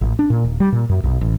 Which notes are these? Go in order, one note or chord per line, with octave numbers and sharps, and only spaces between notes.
A1
D4
A#2
D#1
G3
A#2
F#2
B1
A1